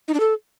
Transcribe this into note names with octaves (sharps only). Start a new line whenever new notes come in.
D#4
D4
A4